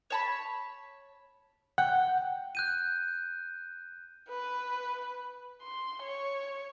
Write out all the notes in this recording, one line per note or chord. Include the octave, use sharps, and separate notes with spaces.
C#5 A5 B5
F#5 G5
F#6 G6 D#7
B4
C6
C#5